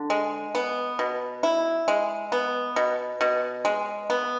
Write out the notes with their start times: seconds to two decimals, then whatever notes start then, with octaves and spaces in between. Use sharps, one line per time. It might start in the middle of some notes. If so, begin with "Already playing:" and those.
Already playing: D3
0.10 G#3
0.55 B3
0.99 B2
1.43 E4
1.88 G#3
2.32 B3
2.76 B2
3.21 B2
3.65 G#3
4.10 B3